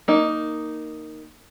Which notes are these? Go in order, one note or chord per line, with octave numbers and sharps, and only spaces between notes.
A#3 D#4